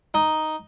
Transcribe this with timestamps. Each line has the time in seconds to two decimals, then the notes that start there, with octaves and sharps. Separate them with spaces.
0.14 D#4